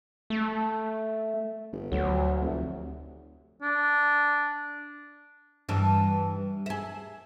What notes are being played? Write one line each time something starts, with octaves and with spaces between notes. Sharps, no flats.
A3
G1
D2 F#3
F1
D4
G2 E3 D4
G#4 E5